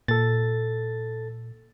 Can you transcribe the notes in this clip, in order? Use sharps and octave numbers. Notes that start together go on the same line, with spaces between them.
A#2 A4 A6